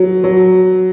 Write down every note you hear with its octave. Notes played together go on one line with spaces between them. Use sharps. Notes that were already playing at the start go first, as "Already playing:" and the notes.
Already playing: F#3
F#3